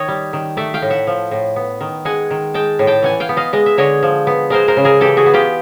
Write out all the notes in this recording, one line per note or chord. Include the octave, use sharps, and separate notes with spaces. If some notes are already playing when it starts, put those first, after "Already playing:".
Already playing: D#3 C#5 D#5
G3
D#3
A3 D5 E5
F5 G5
A2
E5 F#5
F3
A2
B3
D#3
G#3 F#5 G#5
D#3
G#3 G5 A5
A2
G5 A5
E3 F#5 G#5
F5 G5
B3
D#5 F5
G#3 D#5
E5
D3 C#5 D#5
F3
B3
G#3 A#4 C5
A#4 C5
C#3
G#4 A#4
E3 G4 A4
F#4 G#4
B3
F4 G4